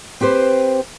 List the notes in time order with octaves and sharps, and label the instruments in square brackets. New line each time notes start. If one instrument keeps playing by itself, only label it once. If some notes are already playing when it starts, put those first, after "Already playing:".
[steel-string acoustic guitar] C4 G4 B4 C5